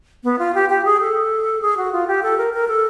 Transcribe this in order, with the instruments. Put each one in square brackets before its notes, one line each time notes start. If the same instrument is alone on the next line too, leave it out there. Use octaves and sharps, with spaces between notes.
[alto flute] B3
F4
G4
G4
G#4
A4
G#4
F#4
F4
G4
A4
A#4
A#4
A4